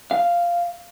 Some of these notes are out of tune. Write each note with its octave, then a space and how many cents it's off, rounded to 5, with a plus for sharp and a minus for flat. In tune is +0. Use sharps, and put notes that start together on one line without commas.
F5 -10